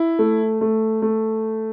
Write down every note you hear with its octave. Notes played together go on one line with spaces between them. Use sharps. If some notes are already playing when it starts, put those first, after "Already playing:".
Already playing: E4
A3
A3
A3